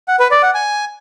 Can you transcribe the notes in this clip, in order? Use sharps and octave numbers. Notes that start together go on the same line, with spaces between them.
F#5
B4
D5
F#5
G#5